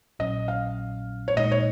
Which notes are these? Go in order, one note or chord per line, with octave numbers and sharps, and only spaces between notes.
A#1 A#2 F#3 C#4 D#5
F5
C#5
A#2 G#3 D#4 D#5
C#5